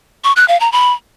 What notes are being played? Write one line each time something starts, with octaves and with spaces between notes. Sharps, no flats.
C#6
F#6
F5
A#5
B5